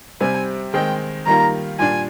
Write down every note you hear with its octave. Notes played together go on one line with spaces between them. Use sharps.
C3 G3 C4 G#5
D#3 G#3 C4 D#4 G5
D#3 G3 A#3 F4 A#5
A#2 G3 D4 G#5